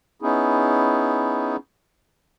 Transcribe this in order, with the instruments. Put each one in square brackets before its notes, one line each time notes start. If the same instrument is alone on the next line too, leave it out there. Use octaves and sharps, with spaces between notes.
[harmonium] B3 C#4 D#4 E4 G#4